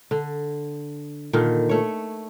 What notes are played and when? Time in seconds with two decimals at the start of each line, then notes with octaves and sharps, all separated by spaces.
0.11 D3
1.33 A#2 D3 D#3
1.69 A3 C#5